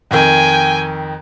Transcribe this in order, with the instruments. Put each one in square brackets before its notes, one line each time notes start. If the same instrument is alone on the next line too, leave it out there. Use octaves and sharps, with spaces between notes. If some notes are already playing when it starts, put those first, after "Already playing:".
[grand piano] F2 D#3 [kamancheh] G5 G#5